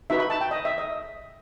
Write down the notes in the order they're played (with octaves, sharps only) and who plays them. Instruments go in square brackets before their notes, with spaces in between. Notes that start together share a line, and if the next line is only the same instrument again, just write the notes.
[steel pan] D#4 F#4 B4 E5
B5
A5
G5
D#5
E5
D#5